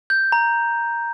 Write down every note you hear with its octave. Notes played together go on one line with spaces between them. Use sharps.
G6
A#5